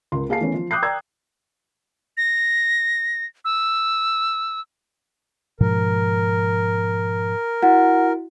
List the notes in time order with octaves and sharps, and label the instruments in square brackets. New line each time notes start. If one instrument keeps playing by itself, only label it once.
[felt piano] C#2 A#4 C6
A#3 G#4 F5 A5 C7
E3 A3 B3 C#4
F3
G5 D6 D#6 F#6 G6 C7
D5 G5 A#5 E6 G#6
[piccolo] A#6
E6
[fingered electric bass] G#2 B2 F3 [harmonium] A#4
[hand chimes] E4 F#4 [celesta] F#5